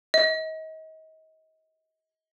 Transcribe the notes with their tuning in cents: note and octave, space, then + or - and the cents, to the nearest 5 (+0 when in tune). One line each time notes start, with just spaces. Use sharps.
D#5 +35